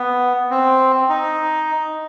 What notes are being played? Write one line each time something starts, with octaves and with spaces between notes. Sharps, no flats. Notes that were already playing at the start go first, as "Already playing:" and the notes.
Already playing: B3
C4
D#4